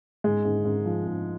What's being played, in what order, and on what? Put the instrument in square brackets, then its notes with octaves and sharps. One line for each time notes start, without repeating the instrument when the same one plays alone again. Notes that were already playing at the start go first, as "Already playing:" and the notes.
[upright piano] G#2 G#3
G#2
G#2
F3
G#2